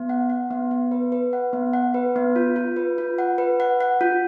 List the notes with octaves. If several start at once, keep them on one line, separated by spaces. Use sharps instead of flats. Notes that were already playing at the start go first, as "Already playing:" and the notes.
Already playing: B3
F#5
F#5
B3
B3
B4
B4
F#5
B3
F#5
B4
B3
F4
F4
B4
F4
F#5
B4
F#5
F#5
F4